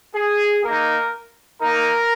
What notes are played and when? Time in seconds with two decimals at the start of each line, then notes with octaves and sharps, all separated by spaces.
0.15 G#4
0.64 A#3 D#4 A#4
1.61 A#3 D#4 A#4 A#5